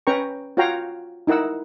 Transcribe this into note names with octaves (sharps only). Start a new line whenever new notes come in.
C#4 B4 G5 A#5 C#6
F4 F#4 C#5 F5 G5 A#5
D#4 E4 A#4 F#5 E6